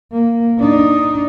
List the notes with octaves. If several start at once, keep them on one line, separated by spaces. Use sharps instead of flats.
A#3
D4 D#4